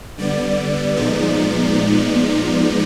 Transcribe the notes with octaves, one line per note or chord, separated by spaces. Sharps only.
D3 G3 B3 D5
A#2 F3 G#3 B3 D#4